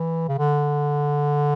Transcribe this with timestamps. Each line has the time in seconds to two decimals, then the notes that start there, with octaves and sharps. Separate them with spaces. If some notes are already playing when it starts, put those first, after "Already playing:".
Already playing: E3
0.28 C#3
0.38 D3